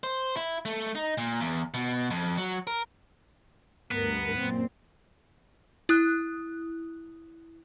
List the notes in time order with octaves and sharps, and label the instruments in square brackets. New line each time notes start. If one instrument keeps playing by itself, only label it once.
[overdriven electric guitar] C5
E4
A3
D#4
A#2
E2
B2
F2
F#3
A#4
[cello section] D2 G2 A#4 [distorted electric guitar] B3
[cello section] F#2 A#2 C4
[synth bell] E4 D#6 F#6